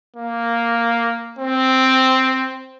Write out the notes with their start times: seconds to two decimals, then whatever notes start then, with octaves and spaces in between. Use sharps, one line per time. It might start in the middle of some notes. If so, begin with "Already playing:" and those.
0.16 A#3
1.39 C4